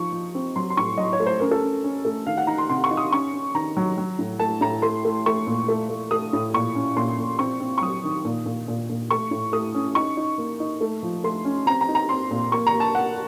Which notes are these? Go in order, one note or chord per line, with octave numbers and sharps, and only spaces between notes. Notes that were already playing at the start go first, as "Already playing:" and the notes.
Already playing: F3 D#4 C#6
F3
C4
F#3 C6
C6
A2 C#6
F#3 D#5
C#5
A3
C5
C#4 A#4
A4
C#4
C#4
A3
D#3 F5
F#5
D#4 A#5
C6
C3 C6
C#6
D#4
D#6
C#4 C#6
C#4
D#3 A#5
F#3
F#3
A2
A3 A5
A2 A#5
A3 C6
A3
A3 C#6
A#2
A3
A3
A3 D#6
A2
A#2 C#6
C#4
A#2 C6
A#2
C4 C#6
C4
C#6
F#3 D#6
D#3
A#2
A#2
A#2
A#2
A3 C#6
A2
A3 D#6
C#4
D#4 C#6
D#4
A#3
D#4
A3
F3
A3 C6
C#4
C4 A#5
A#5
D#4
A#5
C4 C6
A#2
A#3 C#6
A#5
A#3
A5
A#3 F#5